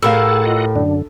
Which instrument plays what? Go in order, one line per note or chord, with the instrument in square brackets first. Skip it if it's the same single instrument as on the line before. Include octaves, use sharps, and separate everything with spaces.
[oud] A2 [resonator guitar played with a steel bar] G4 A#4 F5 [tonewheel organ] G#4 F#5 A5 [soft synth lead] E6
[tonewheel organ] F4 D#5 F#5
[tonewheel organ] F#2 D3 [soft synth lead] D4